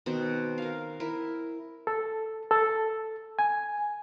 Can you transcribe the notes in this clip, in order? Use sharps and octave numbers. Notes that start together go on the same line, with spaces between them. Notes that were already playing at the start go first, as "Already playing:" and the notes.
B2 D#3 C4
A#4 F5
E4 A#4
A4
A4
G#5